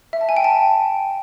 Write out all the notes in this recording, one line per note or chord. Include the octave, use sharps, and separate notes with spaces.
E5
A5
G#5
G5
A5